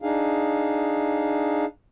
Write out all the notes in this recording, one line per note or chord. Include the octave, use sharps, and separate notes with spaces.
D4 D#4 G#4 F5